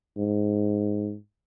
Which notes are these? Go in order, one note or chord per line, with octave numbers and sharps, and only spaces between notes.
G#2